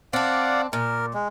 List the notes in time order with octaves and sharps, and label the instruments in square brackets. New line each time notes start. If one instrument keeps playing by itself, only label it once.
[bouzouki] C4 D4 [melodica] D5 F5 F#5
[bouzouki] A#2 [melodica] A#4
[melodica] G#3